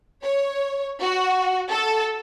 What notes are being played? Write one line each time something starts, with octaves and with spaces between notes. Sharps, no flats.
C#5
F#4
A4